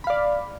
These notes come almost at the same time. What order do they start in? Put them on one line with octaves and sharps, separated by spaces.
B5 F5 D5